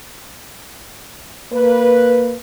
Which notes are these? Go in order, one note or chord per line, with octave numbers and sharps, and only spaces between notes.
A#3 B4